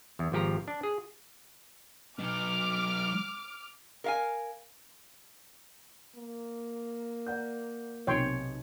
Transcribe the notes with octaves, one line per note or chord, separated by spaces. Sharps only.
E2
G#1 F3 G4 A#5
D4
G#4
F#3 D#4 D6 F6
A#4 F5 G#5
A#3
D5 F#5 G6
B1 C3 C#5 G5 C6